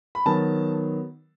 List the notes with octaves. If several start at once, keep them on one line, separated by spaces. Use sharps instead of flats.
B5
D#3 F#3 B3 A5